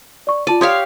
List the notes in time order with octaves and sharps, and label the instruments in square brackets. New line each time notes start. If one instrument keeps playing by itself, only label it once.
[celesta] D5 C#6
[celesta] F4 A5 D#7 [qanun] D5
[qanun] G4 C#5 F5 [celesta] C6 D#6 G#6